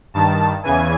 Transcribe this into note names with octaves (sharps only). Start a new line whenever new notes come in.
G2 D#3 A5
E2 C#3 E3 G#5